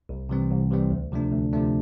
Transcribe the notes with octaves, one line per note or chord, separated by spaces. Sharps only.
C2
C3 E3 G3 C4
C2
C3 E3 G3 C4
D2
C3 F3 A3 D4
D2
C3 F3 A3 D4